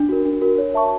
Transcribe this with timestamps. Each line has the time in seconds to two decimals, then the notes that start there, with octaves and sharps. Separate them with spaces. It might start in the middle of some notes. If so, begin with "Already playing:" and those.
Already playing: D4
0.09 F#4 A#4
0.25 D4
0.42 F#4 A#4
0.58 C#5
0.75 E5 A5 C#6